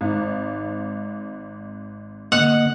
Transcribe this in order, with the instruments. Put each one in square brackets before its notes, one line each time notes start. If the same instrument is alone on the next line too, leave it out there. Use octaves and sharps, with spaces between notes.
[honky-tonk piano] G#1 G#2
[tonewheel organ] D3 A#3 D#5 [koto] F#5